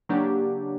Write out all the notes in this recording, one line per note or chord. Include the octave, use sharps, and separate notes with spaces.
C#3 F#3 A#3 D4 G4